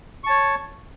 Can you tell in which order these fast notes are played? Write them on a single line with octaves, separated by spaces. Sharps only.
C#6 A5 C#5